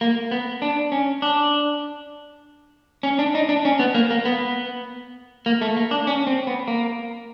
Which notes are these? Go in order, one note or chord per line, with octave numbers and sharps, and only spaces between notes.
A#3
B3
D4
C#4
D4
C#4
D4
D#4
D4
C#4
B3
A#3
A#3
B3
A#3
A3
A#3
D4
C#4
C4
B3
A#3